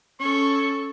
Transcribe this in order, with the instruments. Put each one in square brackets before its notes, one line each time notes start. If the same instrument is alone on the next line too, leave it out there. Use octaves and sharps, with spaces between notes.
[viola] C#4 A4 [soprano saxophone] C#6